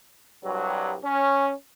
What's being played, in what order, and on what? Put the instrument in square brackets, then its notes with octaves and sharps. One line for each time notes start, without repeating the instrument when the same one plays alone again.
[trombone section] C2 G2 F#3
C#4